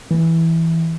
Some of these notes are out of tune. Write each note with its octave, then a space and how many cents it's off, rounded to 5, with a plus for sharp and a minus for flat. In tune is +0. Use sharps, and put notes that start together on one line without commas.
E3 -5